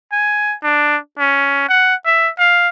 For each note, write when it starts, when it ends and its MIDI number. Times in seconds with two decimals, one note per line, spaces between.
0.12 0.55 80
0.63 0.97 62
1.19 1.64 61
1.69 1.95 78
2.05 2.30 76
2.39 2.69 77